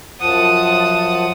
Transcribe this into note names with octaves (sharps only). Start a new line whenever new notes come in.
F#2 F3 F#5 A5 D#6